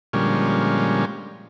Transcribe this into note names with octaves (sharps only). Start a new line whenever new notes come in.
A#2 D3 F3 G3 G#3 C#4